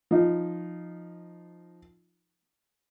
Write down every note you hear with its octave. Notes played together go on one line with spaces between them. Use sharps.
F3 D#4